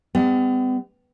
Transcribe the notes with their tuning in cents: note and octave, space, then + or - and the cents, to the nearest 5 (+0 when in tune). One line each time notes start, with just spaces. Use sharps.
G3 +40 B3 +45